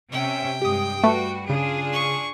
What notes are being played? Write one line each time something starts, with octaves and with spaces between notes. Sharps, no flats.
C3 C#4 E5 G5
G2 G#3 G4 D#6
G3 A3 F#4 B4
C#3 D4 F4 G#4
C#6